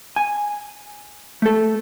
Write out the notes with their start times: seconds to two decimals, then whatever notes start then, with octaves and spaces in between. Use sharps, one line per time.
0.16 G#5
1.42 A3 A4